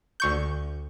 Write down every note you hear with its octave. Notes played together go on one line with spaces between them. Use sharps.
D2 C#6 G6